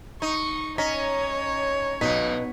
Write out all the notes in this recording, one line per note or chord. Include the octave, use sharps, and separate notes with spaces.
D#4 C#6
C#4 C#5 D#5 A#5 B6
B1 B2 D#4 B6